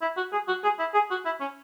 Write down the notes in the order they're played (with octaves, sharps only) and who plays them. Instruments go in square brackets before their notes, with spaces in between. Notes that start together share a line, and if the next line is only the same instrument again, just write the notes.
[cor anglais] E4
F#4
G#4
F#4
G#4
E4
G#4
F#4
E4
C#4